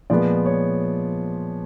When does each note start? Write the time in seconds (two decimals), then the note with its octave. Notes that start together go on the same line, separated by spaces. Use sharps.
0.10 A#2 F3 G#3 B3 D5
0.46 C#5